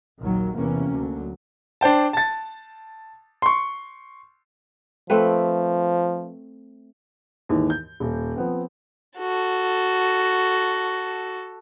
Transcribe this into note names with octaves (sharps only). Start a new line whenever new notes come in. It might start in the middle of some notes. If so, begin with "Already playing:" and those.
A#1 D#2 D#3 F#3
E2 C3 E3 A#3 C#4
D2 F#3
D4 C5 G5 A5
A5 A6
C6 C#6
F3 A3 C4 B4
D#2 G#2 E3
G6
D#1
F3 B3 C4
F#4 A4